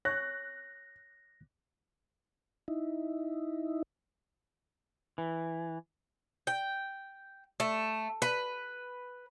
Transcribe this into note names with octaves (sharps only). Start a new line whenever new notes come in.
C#5 F#6 A#6
D#4 E4
E3
G5
A3
B4